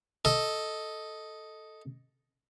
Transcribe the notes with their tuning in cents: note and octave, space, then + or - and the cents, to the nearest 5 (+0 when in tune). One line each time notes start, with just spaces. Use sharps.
A4 +0 D#5 +5